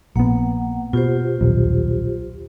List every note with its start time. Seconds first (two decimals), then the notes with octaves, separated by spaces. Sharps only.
0.16 A#1 A#3 B3 F#5
0.93 B2 F4 G4 C5
1.41 D#1 B1